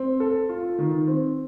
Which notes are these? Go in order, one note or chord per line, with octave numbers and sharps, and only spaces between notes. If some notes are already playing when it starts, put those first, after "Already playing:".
Already playing: C4
A4
F4
D#3
C4